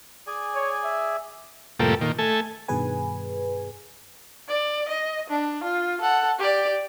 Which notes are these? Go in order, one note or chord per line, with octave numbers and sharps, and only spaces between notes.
G#4 D5 G#5
C#5
E5
F2 A2 C3 G3 A#3 A4
A#2 D#3
A3 A4 G#5
G2 B2 D#3 G#4 B4 G#5
D5
D#5
D4
F4
A4 F#5
G4 D5